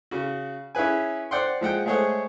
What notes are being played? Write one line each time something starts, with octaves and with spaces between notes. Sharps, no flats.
C#3 F#4
C#4 E4 G#4 B4 G#5
C5 D5 F#5 G5 C6
F3 G#3 F#5 G5
G#3 A3 G#4 C5 C#5 F#5